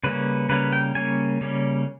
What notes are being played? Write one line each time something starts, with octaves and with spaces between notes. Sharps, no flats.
C#3 G3 A#3 C#4 B4
C#3 G3 A#3 C#4 B4
G5
C#3 G3 A#3 C#4 G#5
C#3 G3 A#3 C#4